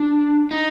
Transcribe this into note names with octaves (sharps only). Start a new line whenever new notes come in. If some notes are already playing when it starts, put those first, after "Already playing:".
Already playing: D4
D#4